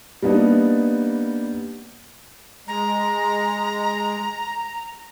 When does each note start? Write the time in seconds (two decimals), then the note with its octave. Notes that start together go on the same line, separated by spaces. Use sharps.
0.22 G3 A#3 B3 D4 D#4
2.68 G#3 A#5